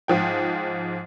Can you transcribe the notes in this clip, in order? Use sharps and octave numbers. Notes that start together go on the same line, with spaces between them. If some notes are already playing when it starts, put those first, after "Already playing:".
G#2 F3 G5